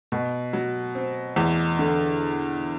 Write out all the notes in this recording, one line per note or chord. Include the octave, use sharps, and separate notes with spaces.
B2
F#3
C4
E2
D3